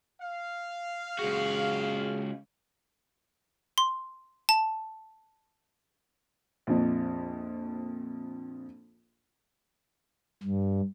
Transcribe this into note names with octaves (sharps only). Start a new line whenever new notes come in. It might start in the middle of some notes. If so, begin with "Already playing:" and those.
F5
C#2 F#4 G#4
C6
A5
A#1 F2
G2